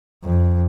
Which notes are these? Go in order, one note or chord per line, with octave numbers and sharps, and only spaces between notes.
F2